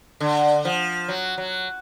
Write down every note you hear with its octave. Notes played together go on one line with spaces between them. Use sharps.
D3
F3
F#3
F#3